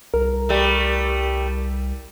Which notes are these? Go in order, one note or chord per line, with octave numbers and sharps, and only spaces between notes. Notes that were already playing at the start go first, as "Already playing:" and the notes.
C2 A#4
G3 A3